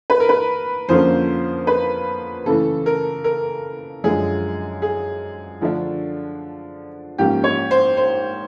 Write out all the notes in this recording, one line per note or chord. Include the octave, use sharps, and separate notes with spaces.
B4
A#4
B4
F2 D3 F3 A#3 C#4 C5
B4
C#3 E3 A3 A4
A#4
A#4
F#2 D3 F3 G#3 G#4
G#4
D3 F3 A3 D4
G#2 F3 A#3 C#4 G4
C#5
C5
C5